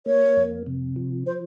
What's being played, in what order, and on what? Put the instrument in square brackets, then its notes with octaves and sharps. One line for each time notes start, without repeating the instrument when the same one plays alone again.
[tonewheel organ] A#3 [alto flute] C#5
[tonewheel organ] F2
C3
F3
[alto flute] C5